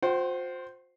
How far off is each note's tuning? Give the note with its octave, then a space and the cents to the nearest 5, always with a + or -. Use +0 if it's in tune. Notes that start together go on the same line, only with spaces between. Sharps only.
F4 +45 C5 +0 G5 -40